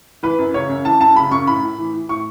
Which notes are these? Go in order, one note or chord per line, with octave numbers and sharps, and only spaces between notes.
E3 B4
F#2
C#3 C#5
F#2
E3 A5
F#2 A5
C#3 B5
F#2 C#6
A2 B5
A2
E3
E3
A2 C#6